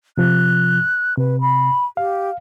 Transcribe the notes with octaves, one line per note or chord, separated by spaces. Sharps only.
C3 F3 F#6
C3 B4
B5
G4 F5